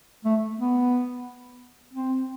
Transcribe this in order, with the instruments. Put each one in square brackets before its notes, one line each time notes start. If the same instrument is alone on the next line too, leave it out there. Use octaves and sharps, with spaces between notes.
[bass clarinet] A3
B3
C4